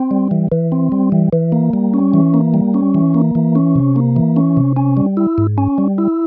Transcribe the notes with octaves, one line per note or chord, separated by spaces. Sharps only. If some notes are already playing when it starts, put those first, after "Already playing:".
Already playing: C4
G3
E3
E3
C4
G3
E3
E3
A#3
G3
C#4
E3
A#3
G3
C#4
E3
A#3
E3
C#4
C3
A#3
E3
C#4
C3
C#4
G3
E4
G#2
C#4
G3
E4